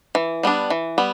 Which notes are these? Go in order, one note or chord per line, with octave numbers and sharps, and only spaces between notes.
E3
G3 B3 D4
E3
G3 B3